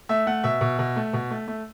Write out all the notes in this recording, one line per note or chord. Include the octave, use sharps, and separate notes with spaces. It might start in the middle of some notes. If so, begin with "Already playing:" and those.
A3 E5
A3 F#5
B2 E5
B2
B2
A3
B2
A3
A3